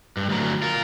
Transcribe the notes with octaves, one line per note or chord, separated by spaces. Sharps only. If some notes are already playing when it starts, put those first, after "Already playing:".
G2
D2 F#3
F4 A#4